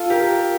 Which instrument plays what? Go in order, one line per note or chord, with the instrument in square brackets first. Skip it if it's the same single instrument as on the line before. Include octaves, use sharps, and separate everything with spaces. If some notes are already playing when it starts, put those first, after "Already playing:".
Already playing: [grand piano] F4 A4
G4 A#4